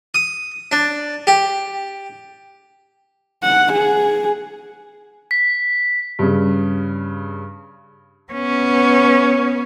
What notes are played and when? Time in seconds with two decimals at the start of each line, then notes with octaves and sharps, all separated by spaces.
0.14 D#6
0.72 D4
1.27 G4
3.43 F#5
3.73 G#4
5.31 B6
6.19 G2 C#3
8.33 B3 C#4